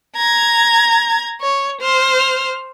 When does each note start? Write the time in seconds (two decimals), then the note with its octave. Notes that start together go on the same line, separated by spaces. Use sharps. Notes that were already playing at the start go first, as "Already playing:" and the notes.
0.16 A#5 G#6
1.41 C#5
1.81 C5 F6